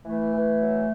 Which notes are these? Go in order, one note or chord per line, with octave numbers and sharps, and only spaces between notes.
E3 A3
E3
F#3